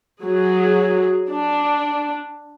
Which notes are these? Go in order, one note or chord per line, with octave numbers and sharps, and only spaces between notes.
F#3 G#4
D4